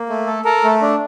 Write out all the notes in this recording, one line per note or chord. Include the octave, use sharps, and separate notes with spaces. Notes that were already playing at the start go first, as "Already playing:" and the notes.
Already playing: A#3
A3
A4
A4 A#4
A3
D4